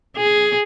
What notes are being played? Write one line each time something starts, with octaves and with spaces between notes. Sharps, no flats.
G#4